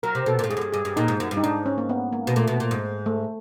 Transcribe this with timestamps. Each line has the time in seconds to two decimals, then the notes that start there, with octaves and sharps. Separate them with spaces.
0.03 F#3 A#4
0.15 C3
0.26 B2 A4
0.39 A#2
0.44 A2
0.50 G#2 G#4
0.57 F#2
0.61 G2
0.73 G2 G#4
0.85 G2
0.97 A#2 D#4
1.08 G#2
1.20 F#2
1.31 G2
1.37 D#4
1.43 G#2 D4
1.66 C#4
1.78 A#3
1.89 B3
2.13 A#3
2.27 B2
2.36 A#2 A3
2.48 B2
2.60 A#2
2.71 G#2
3.06 A3